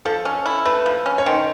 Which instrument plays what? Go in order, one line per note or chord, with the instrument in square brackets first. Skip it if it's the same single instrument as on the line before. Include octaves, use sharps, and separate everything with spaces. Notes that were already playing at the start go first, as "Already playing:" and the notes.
[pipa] F3 [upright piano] A4
[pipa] C#4
E4
[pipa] A3 [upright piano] B4
[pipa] F3
C#4
[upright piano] C#5
[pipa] D#3 [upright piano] C5